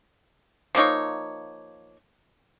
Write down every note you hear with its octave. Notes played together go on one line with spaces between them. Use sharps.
F3 A#3 D#4 C#5